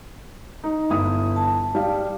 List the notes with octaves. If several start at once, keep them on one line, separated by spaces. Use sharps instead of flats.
D#4
G1 E4 D#6
A5
G3 F5